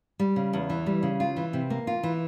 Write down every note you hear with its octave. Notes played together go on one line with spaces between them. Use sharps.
G3
C#3
E2
E3
G3
C#3
F4
E3
C3
A#3
F4
E3